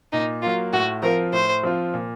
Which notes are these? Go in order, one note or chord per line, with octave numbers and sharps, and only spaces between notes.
A#2 D#4
F#3 A#3 F4
A2 F#4
F3 C4 F4 A#4
A2 C5
F3 C4 F4
A#2